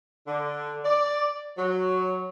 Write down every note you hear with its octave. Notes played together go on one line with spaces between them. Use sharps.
D3
D5
F#3